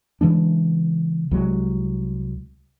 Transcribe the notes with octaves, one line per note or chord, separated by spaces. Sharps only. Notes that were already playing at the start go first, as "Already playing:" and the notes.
C#3 E3 G#3 D4
C2 F#3 G#3